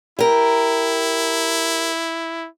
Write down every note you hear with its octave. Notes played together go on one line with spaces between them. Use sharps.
E4 G4 A#4